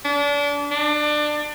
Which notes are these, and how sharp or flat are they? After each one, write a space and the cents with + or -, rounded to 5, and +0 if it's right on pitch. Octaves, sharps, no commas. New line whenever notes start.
D4 -30
D4 +25